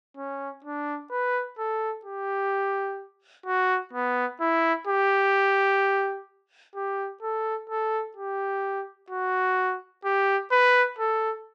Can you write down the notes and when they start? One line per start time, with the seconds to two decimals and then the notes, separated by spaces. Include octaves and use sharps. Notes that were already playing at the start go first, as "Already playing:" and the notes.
0.17 C#4
0.64 D4
1.11 B4
1.59 A4
2.05 G4
3.46 F#4
3.93 B3
4.41 E4
4.88 G4
6.76 G4
7.23 A4
7.70 A4
8.17 G4
9.10 F#4
10.05 G4
10.52 B4
10.99 A4